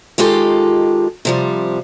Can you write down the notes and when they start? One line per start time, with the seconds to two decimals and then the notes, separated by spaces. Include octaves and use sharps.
0.18 D#3 G#3 F4 G4 A4
1.25 C3 F3 G3